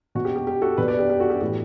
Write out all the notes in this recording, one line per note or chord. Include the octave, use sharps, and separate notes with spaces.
B2 F#4
G4
G4
G4
F#4 A4
B2 B4 D5
B4 D5
G4
G4
F#4 A4
G4
A2 E3 G4